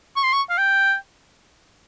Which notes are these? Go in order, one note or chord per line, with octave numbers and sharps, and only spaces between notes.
C#6
C6
C#6
F5
G5